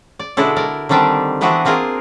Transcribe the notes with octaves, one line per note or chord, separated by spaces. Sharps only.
D5
B2 D3 G#3 D4 E4 A4
A#4 D5
D3 D#3 G3 C4 D4
E3 B3 C4 D4 F#4 F#5
A#3 C4 F4 G#4 A#4